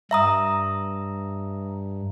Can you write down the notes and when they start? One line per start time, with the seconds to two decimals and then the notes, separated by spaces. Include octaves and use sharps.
0.11 G2 E5 A#5 D#6